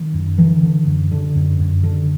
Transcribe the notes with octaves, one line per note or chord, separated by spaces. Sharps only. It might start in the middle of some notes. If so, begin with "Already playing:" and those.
Already playing: D#3
F#2
D3 E3
D3
F#2
D3
F#2
F#2
D3